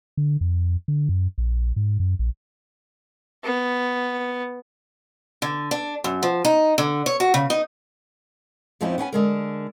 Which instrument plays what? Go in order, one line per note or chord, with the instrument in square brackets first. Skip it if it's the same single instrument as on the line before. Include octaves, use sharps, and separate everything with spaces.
[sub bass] D3
F2
D3
F#2
A#1
G#2
F#2
A#1
[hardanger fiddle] B3
[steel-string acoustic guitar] D3
D4
F#2
F3
D#4
D3
C#5
F#4
C#3
D#4
F2 F3 C4 C#4 D#4 E4
B3 C#4 G5 G#5
D3 G#3 A#4